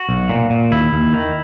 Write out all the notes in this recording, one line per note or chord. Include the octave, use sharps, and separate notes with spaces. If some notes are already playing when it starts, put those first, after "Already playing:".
Already playing: F#4
B1
A#2
A#2
D#2 E4
D#2
D#3